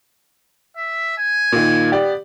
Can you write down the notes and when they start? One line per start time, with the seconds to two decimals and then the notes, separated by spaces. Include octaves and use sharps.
0.77 E5
1.18 G#5
1.52 A#2 D#3
1.92 B3 G4 D5